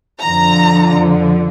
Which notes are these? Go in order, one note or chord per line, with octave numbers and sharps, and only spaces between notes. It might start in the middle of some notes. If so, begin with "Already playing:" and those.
F2 D3 F3 A#5